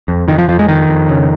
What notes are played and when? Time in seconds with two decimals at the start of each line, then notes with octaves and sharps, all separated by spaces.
0.08 F2
0.28 F2 D#3
0.38 F3
0.49 F2 F3
0.59 G#3
0.69 F2 D#3
0.88 F2
1.09 C#3